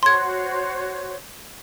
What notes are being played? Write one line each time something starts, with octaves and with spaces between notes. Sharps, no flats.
F#4 C5 C#5 C6 G#6